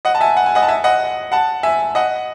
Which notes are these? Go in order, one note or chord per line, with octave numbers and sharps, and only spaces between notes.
D#5 F#5
A5
E5 G#5
F#5
G#5
D#5 F#5
A5
E5 G#5
D#5 F#5
F#5 A5
E5 G#5
D#5 F#5